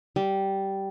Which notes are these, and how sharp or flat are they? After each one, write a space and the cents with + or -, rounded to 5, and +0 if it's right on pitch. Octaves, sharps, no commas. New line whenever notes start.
G3 -10